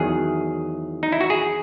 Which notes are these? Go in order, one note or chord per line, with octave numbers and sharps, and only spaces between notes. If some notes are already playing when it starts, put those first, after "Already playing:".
Already playing: E2 D#3 F#3 G#4
D#4
E4
F#4
G#4